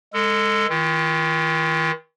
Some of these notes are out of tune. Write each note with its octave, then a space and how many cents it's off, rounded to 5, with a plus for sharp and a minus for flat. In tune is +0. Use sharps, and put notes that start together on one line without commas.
G#3 -10 A4 +20
D#3 +40 F4 -35